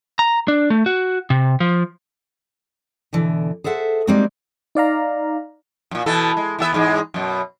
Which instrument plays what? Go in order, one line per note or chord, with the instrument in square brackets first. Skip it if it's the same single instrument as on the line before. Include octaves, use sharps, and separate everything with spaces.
[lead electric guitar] A#5
D4
A3
F#4
C3
F3
[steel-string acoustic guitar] B2 D3 E3
G#4 A4 C5 E5 F#5
G3 G#3 A#3 C4 D#4 F#4
[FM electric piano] D#4 D5 F5 A#5
[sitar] F#2 A#2
B2 E3 A4
G#3
E3 B3 E5
E2 G#2 G#3
F#2 B2